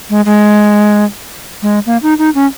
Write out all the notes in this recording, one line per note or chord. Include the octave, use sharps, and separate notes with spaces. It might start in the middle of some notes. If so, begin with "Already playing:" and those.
G#3
G#3
G#3
A#3
D#4
D#4
C#4